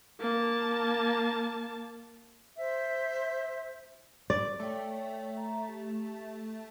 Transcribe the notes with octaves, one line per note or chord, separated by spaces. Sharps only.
A#3 A5
C5 E5
D5
A3 A4 C#5 G5
E5 A#5
G4